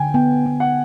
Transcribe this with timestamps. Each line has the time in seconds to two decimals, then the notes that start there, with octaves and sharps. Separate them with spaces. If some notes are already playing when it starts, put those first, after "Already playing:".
Already playing: D3 G5 G#5
0.14 B3 G5
0.46 B3
0.60 F#5